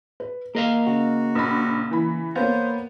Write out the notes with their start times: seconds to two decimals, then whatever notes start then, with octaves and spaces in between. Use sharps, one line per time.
0.20 B4
0.55 A#3 A#4 D#5 F5
0.87 C#3 F#4
1.35 A#1 B5
1.91 E3 B5
2.35 A#3 B3 C5 C#5 F5